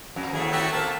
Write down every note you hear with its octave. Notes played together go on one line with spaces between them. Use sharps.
F2
D#2 A2 A3 G#4
F#4 G4 E5
A#3 C4 A5 E6